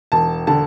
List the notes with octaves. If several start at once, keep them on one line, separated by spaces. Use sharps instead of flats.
E1 A5
D3 A5